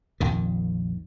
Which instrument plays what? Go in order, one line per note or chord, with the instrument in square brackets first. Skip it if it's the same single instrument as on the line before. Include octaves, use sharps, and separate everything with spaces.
[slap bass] A#1 F2 D#3